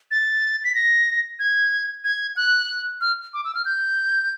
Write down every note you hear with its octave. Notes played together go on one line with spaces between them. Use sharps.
A6
B6
A#6
G#6
G#6
F#6
F6
D6
E6
F6
G6